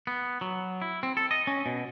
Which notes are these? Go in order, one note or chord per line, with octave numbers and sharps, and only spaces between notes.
B3
F#3
E4
C4
A4
D#5
C#4
B2